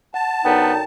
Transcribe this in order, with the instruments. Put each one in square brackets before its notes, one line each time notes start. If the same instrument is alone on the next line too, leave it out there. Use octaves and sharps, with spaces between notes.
[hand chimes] F#5 [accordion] A5
[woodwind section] F#2 D3 D#4 [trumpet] B3 [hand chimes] G5